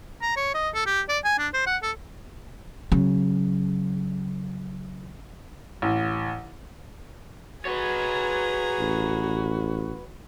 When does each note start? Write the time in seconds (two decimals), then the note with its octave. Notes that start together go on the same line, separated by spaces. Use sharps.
0.22 A#5
0.36 C#5
0.54 D#5
0.74 A4
0.86 G4
1.09 D5
1.24 G#5
1.39 D4
1.54 C5
1.67 F#5
1.82 A4
2.92 C#3 F#3
5.82 A1
7.65 F#4 G#4 B4 C#5 A#5
8.80 A1